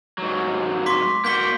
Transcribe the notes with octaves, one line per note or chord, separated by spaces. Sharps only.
G#2 F#3
C6 D6 B6
A#3 F#4 G6 B6 G7